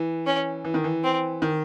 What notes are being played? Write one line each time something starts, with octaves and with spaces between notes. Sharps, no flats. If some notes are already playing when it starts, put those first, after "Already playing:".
Already playing: E3
C#4
E3
D#3
E3
C4
D#3